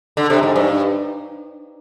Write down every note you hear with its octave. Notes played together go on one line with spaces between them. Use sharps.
D3
C3
G#2
G2